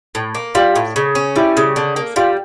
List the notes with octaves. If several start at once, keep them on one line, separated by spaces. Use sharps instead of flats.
A2
A#3
G3 F4
A2
C#3
C#4
G3 E4
C#3
D3
A#3
G3 F4